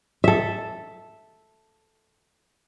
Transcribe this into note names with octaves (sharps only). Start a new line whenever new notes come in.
A4 E5